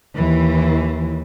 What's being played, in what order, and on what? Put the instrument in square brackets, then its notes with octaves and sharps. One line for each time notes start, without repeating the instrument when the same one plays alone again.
[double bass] D#2 [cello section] E3